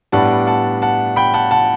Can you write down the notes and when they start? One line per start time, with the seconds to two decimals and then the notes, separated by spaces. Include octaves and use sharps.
0.12 A2 G3 B3 D4 F#5 A5
0.47 F#5 A5
0.82 F#5 A5
1.16 G5 B5
1.34 F#5 A5
1.51 F#5 A5